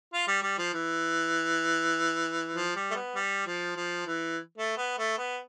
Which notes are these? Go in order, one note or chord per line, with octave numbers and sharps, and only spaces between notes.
F4
G3
G3
F3
E3
F3
G3
A3
B3
G3
F3
F3
E3
A3
B3
A3
B3